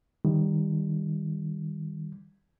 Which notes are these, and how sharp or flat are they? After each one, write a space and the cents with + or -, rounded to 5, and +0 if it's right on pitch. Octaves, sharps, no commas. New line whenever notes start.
D#3 +5 G3 +15